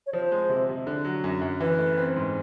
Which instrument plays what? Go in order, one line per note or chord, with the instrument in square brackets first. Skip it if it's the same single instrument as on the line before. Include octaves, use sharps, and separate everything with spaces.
[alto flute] C#5
[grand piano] F3 [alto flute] C5
[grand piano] G#3
C3
C3
D3
F#3
F#2
F#2
[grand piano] E3 [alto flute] B4
[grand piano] A3
C4
G#2